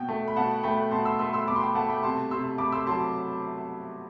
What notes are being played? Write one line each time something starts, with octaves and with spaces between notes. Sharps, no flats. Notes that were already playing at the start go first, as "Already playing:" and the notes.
Already playing: B2 G5
A3
B5
B2 F#5 A5
A3 G5 B5
B2 A5 C6
C6 E6
A3 C6 E6
C6 E6
B2 B5 D6
C6
G5 B5
A3 F#5 A5
G5 B5
C3 A5 C6
C3 C6 E6
A3 B5 D6
C6 E6
F#3 A5 C6